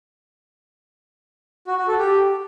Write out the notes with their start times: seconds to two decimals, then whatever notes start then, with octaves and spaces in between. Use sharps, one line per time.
1.67 F#4
1.78 F#4
1.88 A4
1.98 G4